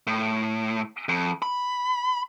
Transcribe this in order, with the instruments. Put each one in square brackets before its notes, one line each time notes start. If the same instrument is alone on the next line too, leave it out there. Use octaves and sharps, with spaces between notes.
[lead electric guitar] A2
F2
B5